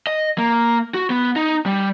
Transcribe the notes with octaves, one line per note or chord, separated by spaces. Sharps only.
D#5
A#3
F#4
B3
D#4
G3